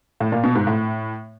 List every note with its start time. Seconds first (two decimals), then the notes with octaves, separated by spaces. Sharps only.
0.20 A2
0.32 A#2
0.44 B2
0.55 G#2
0.67 A2